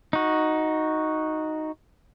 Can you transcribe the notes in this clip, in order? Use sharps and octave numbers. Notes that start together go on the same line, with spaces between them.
D#4 F#4